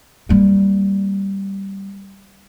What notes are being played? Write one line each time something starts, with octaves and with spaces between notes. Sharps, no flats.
G3 A#3